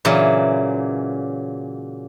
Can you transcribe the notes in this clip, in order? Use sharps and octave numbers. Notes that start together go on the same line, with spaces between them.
A#2 C#3 E3 F#3